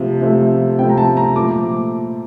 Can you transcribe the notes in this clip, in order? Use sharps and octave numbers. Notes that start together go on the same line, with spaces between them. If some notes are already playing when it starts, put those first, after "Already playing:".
Already playing: C3 F3 A3
C3 F3 A3
C3 F3 A3 G5
A#5
A5
A#5
A#2 F3 A3 D6